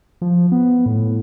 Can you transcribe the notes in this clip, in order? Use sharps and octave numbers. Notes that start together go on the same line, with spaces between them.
F3
B3
A2